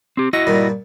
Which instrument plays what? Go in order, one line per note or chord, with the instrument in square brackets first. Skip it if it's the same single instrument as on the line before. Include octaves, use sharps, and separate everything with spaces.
[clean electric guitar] C4 G4
[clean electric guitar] E4 F#4 D#5 [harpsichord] C#6
[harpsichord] G2 A#2 D#3